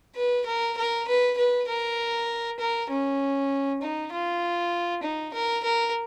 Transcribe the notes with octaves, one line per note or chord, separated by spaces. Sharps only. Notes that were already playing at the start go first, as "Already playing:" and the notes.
B4
A#4
A#4
B4
B4
A#4
A#4
C#4
D#4
F4
D#4
A#4
A#4